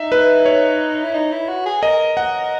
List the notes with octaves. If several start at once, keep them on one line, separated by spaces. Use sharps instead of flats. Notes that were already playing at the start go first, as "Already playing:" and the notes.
Already playing: D#4 E5
B4
C#5
E4
D#4
E4
F#4
G#4
A#4 D#5
F#5